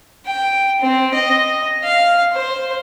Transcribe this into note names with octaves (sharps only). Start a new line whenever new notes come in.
G5
C4
D#5
F5
C5